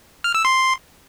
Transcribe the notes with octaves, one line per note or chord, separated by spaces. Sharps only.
F6
E6
C6